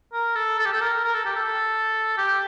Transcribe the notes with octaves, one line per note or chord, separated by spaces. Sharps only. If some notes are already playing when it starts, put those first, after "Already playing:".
A#4
A4
A4
G4
A4
A#4
A#4
A4
G4
A4
G4